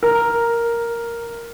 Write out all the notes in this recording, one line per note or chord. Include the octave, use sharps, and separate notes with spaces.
A#4